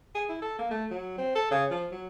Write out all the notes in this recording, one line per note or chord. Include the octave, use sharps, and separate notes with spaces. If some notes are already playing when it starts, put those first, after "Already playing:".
G#4
E4
A4
A#3
A3
F#3
C4
A4
C#3
F3
F#3